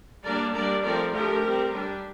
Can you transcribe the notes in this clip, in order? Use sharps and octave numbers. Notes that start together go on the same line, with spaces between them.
G3 A#3 D4 A#4 D5
G3 A#3 D4 A#4 D5
F3 A3 C4 A#4 D5
F3 A3 D4 G4 A#4
G3 C4
G3 D4